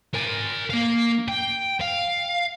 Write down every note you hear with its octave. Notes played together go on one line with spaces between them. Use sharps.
A#4 G#5
A#3 F5
G5
F5